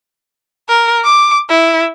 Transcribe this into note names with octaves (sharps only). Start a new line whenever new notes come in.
A#4
D6
E4